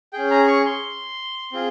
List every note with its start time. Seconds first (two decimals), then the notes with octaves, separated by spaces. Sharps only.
0.13 C#4 G#4 G5
0.31 A#5
0.47 C#6
0.66 C6
1.52 C4 F4 G#4